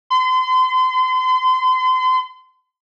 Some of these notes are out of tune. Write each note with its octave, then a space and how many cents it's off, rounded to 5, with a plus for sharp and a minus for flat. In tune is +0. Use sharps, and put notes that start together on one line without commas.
C6 -35